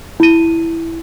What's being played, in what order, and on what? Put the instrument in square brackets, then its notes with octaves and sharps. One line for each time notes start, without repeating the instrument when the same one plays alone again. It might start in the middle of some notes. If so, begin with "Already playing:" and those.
[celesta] E4 D#7